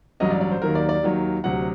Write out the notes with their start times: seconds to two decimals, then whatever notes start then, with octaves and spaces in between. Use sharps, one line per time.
0.20 A1 G2 F#3 D#5
0.30 D5
0.41 D5
0.51 C5
0.62 D#2 D#3 F#3 A#4
0.75 D5
0.89 D5
1.03 D#2 D#3 F#3
1.44 D2 C3 F#3 F#5